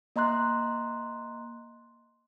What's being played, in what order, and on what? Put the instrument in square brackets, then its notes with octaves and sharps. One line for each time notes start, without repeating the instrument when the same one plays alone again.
[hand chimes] A#3 D#5 A#5 C6 F#6